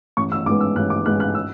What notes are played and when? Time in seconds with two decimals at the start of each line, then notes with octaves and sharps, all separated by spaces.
0.17 A1 C#6
0.32 E6
0.46 G#2 G#3 B3 D6
0.60 E6
0.76 A1 F#6
0.90 D6
1.05 G#2 G#3 B3 F#6
1.20 F#6
1.35 E6